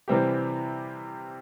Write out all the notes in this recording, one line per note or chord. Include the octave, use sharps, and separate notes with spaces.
C3 E3 G3 C4 G4